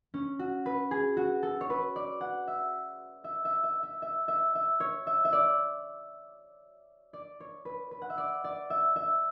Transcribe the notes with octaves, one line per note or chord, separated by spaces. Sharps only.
C#4
F#4
B4
G#4
F#4
A4
C#5
B4
D5
F#5
E5
E5
E5
E5
E5
E5
E5
E5
C#5
E5
E5
D5
D5
C#5
B4
B4
F#5
E5
D5
D5
E5
E5